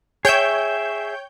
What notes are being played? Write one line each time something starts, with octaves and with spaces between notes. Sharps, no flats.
G#4 C#5 E5 G5 G6